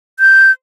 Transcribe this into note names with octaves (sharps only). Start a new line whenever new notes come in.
G6